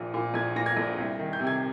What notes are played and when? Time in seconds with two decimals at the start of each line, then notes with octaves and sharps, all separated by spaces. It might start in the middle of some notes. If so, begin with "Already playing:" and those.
Already playing: A#1 A#2
0.14 A#2
0.34 A#1 G#6
0.56 A#2 A#6
0.66 G#6
0.77 A#1
0.98 C2
1.19 D#3
1.33 G6
1.40 C3
1.47 G#6